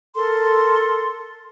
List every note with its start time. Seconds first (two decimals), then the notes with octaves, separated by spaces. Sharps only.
0.16 A4 A#4 C6